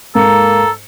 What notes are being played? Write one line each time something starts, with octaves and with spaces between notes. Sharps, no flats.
G#2 A#3 A4 A#5 C#7